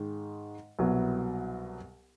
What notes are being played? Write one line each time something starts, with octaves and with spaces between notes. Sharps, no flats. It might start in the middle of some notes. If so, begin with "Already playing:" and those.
Already playing: G#2 D#3 G#3
C2 B2 F#3 B3 E4